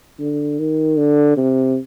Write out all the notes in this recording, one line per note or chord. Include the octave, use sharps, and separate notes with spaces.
D3
D#3
D3
C3